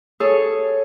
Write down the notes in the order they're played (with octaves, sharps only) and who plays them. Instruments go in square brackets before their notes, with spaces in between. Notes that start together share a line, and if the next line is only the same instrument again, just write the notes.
[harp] G#4 A4 C#5